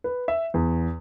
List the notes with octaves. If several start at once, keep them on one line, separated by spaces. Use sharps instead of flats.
B4
E5
E2